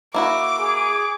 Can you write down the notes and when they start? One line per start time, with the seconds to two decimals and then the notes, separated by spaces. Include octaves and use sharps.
0.14 A#3 E4 F#4 D6
0.59 G#4